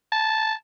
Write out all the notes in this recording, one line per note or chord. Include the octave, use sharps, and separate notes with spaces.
A5